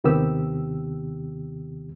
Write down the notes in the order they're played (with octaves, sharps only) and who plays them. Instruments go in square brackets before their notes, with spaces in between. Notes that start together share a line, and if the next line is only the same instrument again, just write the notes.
[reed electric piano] D#2 C3 D#3 B3 G4 E6